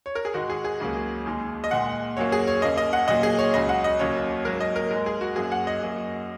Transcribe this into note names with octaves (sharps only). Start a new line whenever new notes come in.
C#5
A#4
G#4
G#2 D#3 G#3 F#4
G#4
G#4
C#2 C#3 F#3 A#3
D#2 D#3 G#3
D#5
A#2 G#3 F#5
F#2 F#3 A#3 C#5
G#4
C#5
D#2 C#3 A#3 D#5
D#5
F#5
A#2 F#3 A#3 D#5
G#4
C#5
C#2 C#3 F#3 D#5
F#5
D#5
D#2 C#3 F#3 A#3 C#5
G#2 F#3 A#3 A#4
D#5
A#4
G#2 G#3 A#4
G#4
F#4
F#2 F#3 A#3 G#4
F#5
D#5
F#2 F#3 A#3